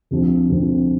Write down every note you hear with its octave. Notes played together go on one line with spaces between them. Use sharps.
D2 C3 F3 C4
D2 C3 F3 C4